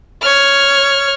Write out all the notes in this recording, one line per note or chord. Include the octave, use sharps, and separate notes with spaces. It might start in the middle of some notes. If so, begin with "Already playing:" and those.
C#5 F6